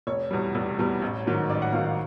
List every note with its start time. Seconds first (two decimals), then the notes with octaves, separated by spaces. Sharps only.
0.07 F1 C#5
0.31 E2 B2 G3
0.55 F1
0.78 E2 B2 G3
1.02 A1
1.26 G#2 D#3 F#3
1.49 A1 D5
1.62 F#5
1.73 G#2 D#3 F#3 F5
1.85 F5